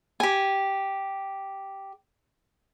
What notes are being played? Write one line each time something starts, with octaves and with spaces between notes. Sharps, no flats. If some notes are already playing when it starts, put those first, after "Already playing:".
G4 G#5